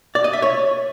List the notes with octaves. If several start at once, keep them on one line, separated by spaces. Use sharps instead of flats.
D5
D#5
E5
C#5